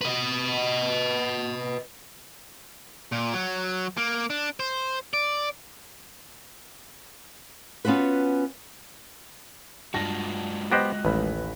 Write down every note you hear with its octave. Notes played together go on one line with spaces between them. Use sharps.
B4 D#5
A#2
F#3
A#3
D4
C5
D5
B3 C#4 F4 F#4 B4
G2 G#3 F4 F#4 A5 A#6
B3 G4 C5 D#5 F#6 A#6
A1 D#2 B4 B5